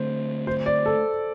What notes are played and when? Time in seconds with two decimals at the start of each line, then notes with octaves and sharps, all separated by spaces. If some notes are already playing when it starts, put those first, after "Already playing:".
Already playing: D3 A3 C4 C5
0.47 C5
0.66 D5
0.86 A4